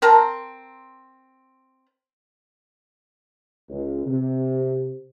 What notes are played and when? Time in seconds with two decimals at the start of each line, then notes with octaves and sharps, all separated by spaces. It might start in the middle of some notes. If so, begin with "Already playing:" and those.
0.02 C4 A#4 A5 A#5
3.70 C#2
4.07 C3